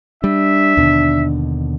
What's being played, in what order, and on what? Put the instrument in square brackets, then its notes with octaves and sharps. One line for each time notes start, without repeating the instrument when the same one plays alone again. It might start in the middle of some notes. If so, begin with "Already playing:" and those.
[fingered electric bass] G3 [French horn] D4 [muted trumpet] E5
[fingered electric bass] D#2 B2 D3